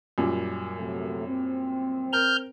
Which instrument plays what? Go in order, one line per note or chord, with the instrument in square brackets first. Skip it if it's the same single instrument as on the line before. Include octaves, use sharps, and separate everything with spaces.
[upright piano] F#2 A#2 G3
[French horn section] C3 F#3 A3
C4
[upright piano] A#4 [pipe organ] F6 G6